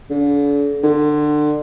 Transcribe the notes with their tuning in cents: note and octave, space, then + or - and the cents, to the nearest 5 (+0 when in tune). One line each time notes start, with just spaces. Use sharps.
D3 -40
D3 +25